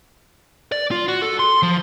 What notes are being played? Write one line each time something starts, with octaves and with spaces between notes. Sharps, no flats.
D5
F4
F#4
A4
C6
F3